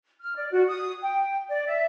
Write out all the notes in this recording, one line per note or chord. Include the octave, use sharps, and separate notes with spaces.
F6
D5
F#4
D#6
G5
D5
E5